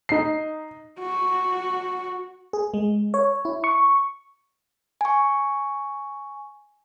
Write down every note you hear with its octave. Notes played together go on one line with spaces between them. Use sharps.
D#4 C7
F#4
G#4
G#3
C#5
E4
C#6
G#5 C#6